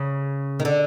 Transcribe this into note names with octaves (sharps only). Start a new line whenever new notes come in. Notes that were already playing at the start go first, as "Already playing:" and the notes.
Already playing: C#3
D#3
D3